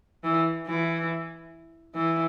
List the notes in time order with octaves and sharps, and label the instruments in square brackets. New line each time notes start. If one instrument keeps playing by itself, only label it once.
[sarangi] E3
E3
E3